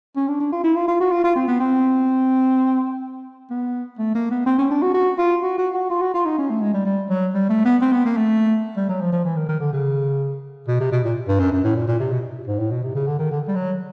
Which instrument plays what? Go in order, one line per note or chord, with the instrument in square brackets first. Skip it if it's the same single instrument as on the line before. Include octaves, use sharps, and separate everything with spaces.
[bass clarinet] C#4
D4
D4
F4
E4
F4
F4
F#4
F4
F4
C4
B3
C4
B3
A3
A#3
B3
C4
C#4
D4
F#4
F#4
F4
F#4
F#4
F#4
F4
F#4
F4
D#4
C#4
A3
G#3
G3
G3
F#3
G3
A3
B3
C4
B3
A#3
A3
G3
F#3
F3
F3
E3
D#3
D#3
D3
C#3
B2
C3
B2
A#2
G2
F#2
F#2
A2
A#2
A#2
C3
B2
G#2
A2
B2
C3
C#3
D3
D#3
D3
G3
F#3